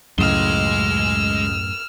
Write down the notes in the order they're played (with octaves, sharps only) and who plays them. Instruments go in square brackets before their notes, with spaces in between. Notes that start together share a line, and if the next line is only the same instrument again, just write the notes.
[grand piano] C#2 [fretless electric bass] F#2 A2 [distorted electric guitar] G#3 C6 [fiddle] E6 F6